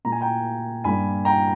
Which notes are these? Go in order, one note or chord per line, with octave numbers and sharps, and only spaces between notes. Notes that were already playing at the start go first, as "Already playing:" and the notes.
A#2 A#3 A#5
G#5
G5 A#5
G2 G3 A#3 G#5 B5
G5 A#5